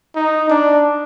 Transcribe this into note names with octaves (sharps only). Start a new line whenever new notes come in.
D#4
D4